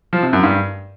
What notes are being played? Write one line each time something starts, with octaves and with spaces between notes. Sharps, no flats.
F3
C3
F#2
G2